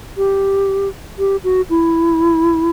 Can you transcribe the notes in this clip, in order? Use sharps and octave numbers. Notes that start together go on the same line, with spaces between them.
G4
G4
F#4
E4